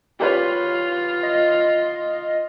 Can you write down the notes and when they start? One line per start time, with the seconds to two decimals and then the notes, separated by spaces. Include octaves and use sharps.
0.20 F4 G4 B4 C#5
1.23 D#5